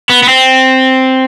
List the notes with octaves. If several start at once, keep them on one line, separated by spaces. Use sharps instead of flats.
B3
B3
C4